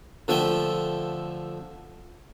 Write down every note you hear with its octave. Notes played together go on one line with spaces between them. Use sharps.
D3 F3 A3 E5 G5